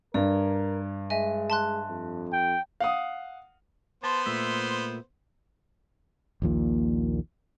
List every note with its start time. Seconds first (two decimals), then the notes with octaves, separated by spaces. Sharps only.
0.14 G2 A#4 D5
1.10 G#3 D#5 E5 G#5
1.50 A5 C6 F#6
1.89 F2
2.33 G5
2.80 F5 F#5 D#6
4.04 B3 C5 A5 C6
4.26 A#2 A3 E5
6.42 A#1 D#2 A#2